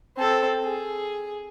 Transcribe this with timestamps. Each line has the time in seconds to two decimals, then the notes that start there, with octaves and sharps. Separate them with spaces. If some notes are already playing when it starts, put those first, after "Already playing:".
0.17 C4 A4
0.64 G#4